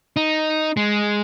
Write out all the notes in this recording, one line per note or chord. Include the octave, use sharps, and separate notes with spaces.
D#4
G#3